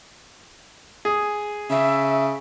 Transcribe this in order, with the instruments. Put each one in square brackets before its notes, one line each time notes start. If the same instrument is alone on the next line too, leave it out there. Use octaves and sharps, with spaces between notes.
[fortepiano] G#4
[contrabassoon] C#3 [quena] E5